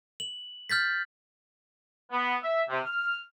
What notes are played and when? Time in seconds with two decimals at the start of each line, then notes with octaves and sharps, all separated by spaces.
0.20 F#7
0.69 F6 G6 A6 B6
2.12 B3
2.43 E5
2.69 C3
2.85 F6